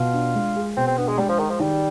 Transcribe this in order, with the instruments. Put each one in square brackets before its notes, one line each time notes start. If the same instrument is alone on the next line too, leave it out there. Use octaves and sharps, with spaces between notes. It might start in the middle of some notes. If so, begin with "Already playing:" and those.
Already playing: [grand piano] B2 [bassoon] F4
[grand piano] D4
G#3
G#4
[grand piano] B2 [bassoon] C4
[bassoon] C4
[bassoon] B3 [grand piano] D4
[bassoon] G#3
[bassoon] G3 [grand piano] G#3
[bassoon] F3
[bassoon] D#3 [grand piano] G#4
[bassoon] F3
[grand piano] D#3 [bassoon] G3